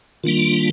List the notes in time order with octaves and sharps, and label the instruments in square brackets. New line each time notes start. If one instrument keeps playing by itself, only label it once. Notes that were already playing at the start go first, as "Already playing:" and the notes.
[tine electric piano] D#3 [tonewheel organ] G3 A#3 D4 F4